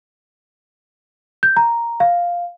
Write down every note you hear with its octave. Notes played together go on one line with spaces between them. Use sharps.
G6
A#5
F5